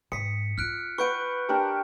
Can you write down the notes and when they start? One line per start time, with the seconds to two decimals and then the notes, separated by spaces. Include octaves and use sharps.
0.12 G#2 D#6 B6 C#7
0.58 E4 F4 F6 F#6 D7
0.98 B4 F#5 C#6 G6 D7
1.49 D4 G4 A#4